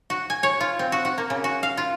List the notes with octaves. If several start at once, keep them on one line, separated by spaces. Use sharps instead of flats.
F#4
G#5
C#5
F4
C4
F#4
F#4
A#3
C#3
F#4
F5
F4